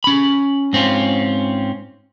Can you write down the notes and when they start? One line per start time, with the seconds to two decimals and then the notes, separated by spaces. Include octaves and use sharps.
0.04 C#4 B5
0.73 G#2 C4 C#4 F4